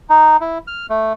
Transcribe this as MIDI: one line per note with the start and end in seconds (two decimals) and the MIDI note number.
0.10 0.37 63
0.41 0.58 64
0.67 0.86 89
0.90 1.13 57